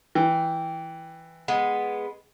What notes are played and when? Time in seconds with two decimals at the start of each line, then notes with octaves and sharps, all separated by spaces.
0.15 E3 G5
1.48 G#3 B3